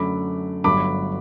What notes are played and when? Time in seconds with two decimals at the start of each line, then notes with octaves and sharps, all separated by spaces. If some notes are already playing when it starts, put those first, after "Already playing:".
Already playing: F#2 D3 F#3 A3 B5 D6
0.64 G1 G2 F#3 A3 B5 D6